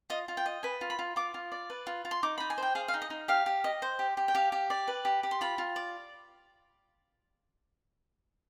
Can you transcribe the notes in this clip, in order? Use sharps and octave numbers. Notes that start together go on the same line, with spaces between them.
F4 D#5
F4
G5
D#5
B4 G#5
F4
B5
F4
F4 D6
F4
D5
B4
F4
F4
C6
D#4 D6
D#4 B5
G#5
C5 G5
G#4 F5
F5
D#4
D#5
D#4
G4 F5
G4
D#5
C5
G4
G4
G5
G4 F5
G4
D5
B4
G4
G4
C6
F4 B5
F4
D5